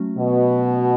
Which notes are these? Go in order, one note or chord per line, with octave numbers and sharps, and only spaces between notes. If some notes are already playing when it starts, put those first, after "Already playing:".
Already playing: F#3 A3 C#4 F#4
B2